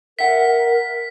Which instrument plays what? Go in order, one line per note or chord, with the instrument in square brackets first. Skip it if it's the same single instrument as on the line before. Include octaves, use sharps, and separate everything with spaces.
[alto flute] A#4 [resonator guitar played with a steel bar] E5 F#5 [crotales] B6